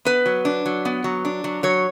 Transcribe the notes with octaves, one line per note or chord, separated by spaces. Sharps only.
B3 B4
F#3
D4
F#3
B3
F#3
D4
F#3
F#3 C#5